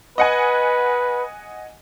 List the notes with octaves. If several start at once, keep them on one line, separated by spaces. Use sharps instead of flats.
B4 D#5 F#5 G#5